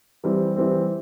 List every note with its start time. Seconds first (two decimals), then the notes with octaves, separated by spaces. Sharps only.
0.24 E3 G3 C4
0.56 E3 G3 C4